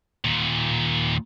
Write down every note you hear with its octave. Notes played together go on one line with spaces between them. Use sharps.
D#2 A#2